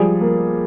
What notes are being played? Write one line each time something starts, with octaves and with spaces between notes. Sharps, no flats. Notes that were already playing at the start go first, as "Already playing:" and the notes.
Already playing: F3 G3 G#4
A#3